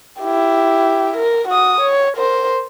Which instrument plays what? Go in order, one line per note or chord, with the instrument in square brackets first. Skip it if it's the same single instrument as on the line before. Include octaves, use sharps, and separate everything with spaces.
[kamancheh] E4 G4
A#4
F#4 D#6
C#5
A#4 C5